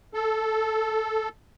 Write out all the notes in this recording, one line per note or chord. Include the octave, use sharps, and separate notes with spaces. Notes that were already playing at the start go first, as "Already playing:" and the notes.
A4